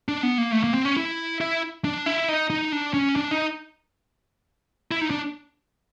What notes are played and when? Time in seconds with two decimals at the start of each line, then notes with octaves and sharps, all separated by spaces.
0.08 D4
0.23 B3
0.38 A#3
0.52 A3
0.64 A#3
0.74 C4
0.85 C#4
0.97 E4
1.41 E4
1.85 D4
2.06 E4
2.29 D#4
2.50 D#4
2.72 D4
2.94 C#4
3.16 D4
3.31 D#4
4.91 E4
5.01 D#4
5.11 D4